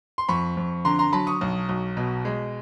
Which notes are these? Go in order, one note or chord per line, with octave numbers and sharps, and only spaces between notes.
C6
F2 B5 C#6
F2
D3 A#5 C6
A#5 C6
F#3 A5 B5
C#6 D#6
B1
B1
B2
G#3